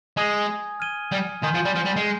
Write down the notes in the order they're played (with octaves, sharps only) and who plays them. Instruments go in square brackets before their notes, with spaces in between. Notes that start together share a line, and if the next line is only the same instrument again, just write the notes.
[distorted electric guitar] G#3 [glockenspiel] G#5 D#6 G#6
[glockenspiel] F6 G#6 D#7 G7
[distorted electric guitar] G3
[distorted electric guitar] D#3 [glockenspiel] G#5 C6 G6
[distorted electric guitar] F3
G3
F3
G3
G#3